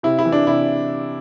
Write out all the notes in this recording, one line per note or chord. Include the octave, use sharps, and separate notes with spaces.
C3 E4
E4
E3
D4
C3 E4